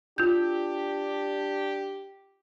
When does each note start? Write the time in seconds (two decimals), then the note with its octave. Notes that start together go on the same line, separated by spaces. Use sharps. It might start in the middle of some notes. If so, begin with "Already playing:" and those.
0.18 D4 F4 G4 G6